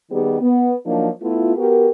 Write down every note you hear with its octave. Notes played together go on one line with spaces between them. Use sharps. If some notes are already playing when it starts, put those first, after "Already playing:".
D#3 G3 B3 D#4 G4 G#4
B3
F3 F#3 A#3 D4 D#4
A3 B3 E4 F4
B3 F#4 G4 A#4